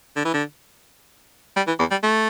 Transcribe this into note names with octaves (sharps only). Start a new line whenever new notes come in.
D3
E3
D3
G3
E3
E2
G3
A3